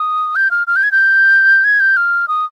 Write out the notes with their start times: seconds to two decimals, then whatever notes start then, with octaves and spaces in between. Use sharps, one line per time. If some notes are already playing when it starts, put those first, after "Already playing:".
Already playing: D#6
0.36 G6
0.51 F6
0.67 F6
0.76 G6
0.83 G#6
0.92 G6
1.64 G#6
1.80 G6
1.97 F6
2.28 D#6